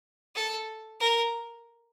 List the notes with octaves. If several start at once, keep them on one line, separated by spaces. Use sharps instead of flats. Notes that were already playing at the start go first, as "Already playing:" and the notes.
A4
A#4